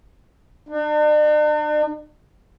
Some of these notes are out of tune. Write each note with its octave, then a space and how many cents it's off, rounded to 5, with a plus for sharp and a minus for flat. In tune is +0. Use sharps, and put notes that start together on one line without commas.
D4 +45